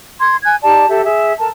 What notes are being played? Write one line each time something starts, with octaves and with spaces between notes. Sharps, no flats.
C6 G#6
G#5 F#6 G#6
D#4 G4 D5 A5
G4 A4 E5
G#4 E5
A4 A#4 A5